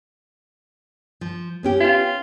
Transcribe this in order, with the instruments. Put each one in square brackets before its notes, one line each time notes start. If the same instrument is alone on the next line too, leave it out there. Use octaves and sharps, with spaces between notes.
[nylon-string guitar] F3
B3 C#4 G4
[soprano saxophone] F4